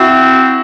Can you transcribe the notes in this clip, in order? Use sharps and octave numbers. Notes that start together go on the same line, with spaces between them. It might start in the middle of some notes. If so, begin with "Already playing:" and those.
Already playing: C4 E4 F#4